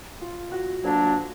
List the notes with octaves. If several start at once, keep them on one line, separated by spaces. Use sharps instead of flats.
F4
F#4
D2 D3 F#3 A#3 D4